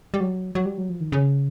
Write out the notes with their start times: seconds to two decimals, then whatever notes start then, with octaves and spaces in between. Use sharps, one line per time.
0.14 G3
0.20 F#3
0.55 F#3
0.65 G3
0.78 F#3
0.90 F3
1.01 D#3
1.12 C#3